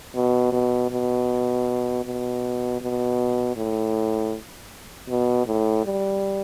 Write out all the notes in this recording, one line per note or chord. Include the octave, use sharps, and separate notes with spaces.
B2
B2
B2
B2
B2
A2
B2
A2
G3